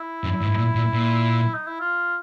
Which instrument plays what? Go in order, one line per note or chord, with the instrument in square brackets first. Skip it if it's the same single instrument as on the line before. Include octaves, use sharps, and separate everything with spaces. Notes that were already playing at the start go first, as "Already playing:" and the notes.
Already playing: [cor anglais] E4
[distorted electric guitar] F#2
G#2
A#2
A#2
A#2
[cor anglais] D#4
E4
F4